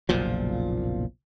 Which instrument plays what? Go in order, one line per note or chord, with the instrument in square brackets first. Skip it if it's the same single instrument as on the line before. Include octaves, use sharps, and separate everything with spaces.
[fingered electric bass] F#1 B1 A#2 F3